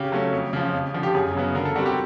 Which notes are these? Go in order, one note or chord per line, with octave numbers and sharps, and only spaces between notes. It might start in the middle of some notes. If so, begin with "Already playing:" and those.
Already playing: C#3 G4
F#3 A3 C#4
F2
C#3 F3
F2
D3 F3
G4
F#2 G#4
C#3 F#3 B3
D3 A#4
A4
G3 C4 F#4
G4